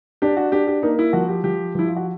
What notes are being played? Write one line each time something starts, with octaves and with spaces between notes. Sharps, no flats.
D4 G4
F#4
D4 G4
G4
A#3 D#4
E4
F3 F#4
G4
F3 G4
F3 E4
F4
F#4